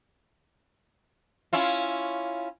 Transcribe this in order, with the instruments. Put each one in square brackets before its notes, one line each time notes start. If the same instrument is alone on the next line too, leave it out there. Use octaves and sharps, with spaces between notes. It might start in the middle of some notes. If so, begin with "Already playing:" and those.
[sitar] C#4 E4 F4